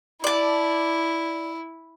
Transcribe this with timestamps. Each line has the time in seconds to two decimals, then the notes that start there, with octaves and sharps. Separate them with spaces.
0.24 E4 D5 A5